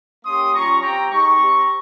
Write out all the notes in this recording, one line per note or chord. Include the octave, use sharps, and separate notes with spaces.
A#3 C#4 G4 C6 D#6
G3 C#4 F4 A#5 C#6
C4 G4 G5 A#5
G#3 D#4 G4 A#5 C#6
C4 G4